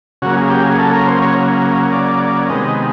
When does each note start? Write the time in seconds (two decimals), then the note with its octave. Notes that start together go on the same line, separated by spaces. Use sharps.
0.22 C#3 F#3 A#3 F#4
0.37 G#4
0.50 G4
0.65 G#4
0.79 A4
0.93 A#4
1.07 C5
1.22 C#5
1.92 D5
2.50 C3 D#3 G#3 B3 D#5